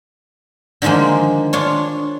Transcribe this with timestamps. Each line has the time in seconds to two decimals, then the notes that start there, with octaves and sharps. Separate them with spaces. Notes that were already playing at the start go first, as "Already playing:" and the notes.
0.82 D3 D#3 F3 G#3 A#3
1.53 D4 F4 C#5